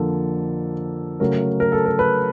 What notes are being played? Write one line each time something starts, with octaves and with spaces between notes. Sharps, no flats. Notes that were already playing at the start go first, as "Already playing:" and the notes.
Already playing: F2 D3 F3 A#3 A4
C#3 F#3 A3 C#4 A#4
A#4
A4
A#4
B4